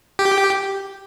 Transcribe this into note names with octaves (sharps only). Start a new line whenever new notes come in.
G4